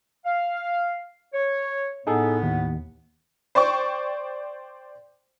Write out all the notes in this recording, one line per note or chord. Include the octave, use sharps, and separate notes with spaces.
F5
C#5
A2 B3 D#4 G#4 A4
D#2
C5 D5 G5 C#6